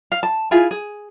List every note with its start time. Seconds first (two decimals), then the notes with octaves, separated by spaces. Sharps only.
0.12 F5
0.23 A5
0.51 E4 F4 G#4 G#5
0.71 G#4